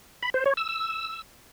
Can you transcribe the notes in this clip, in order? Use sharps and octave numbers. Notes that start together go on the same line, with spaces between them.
B5
C5
C#5
E6
E6